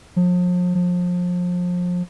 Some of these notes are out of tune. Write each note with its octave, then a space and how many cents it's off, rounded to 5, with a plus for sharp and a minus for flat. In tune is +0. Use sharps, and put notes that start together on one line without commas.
F3 +40
F3 +30